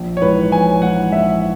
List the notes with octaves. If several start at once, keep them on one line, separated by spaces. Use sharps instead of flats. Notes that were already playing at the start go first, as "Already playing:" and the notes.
Already playing: A#1
C#5
G#2 E3 B4
A#1 G#5
G#2 E3 F#5
A#1 E5